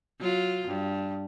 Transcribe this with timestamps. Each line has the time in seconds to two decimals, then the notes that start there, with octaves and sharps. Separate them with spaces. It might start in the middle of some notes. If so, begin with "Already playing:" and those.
0.20 F#3 F4
0.68 G2